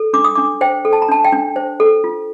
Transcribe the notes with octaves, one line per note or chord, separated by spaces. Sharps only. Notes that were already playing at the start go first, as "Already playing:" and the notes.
Already playing: A4
D4 D6
D#6
D4 D6
C5 G5
A4
A5
A#5
D4 A5
G5
D4
C5
A4
F4